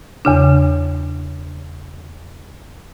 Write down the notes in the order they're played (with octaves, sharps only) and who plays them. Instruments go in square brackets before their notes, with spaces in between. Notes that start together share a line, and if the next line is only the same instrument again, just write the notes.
[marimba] E2 C#3 D4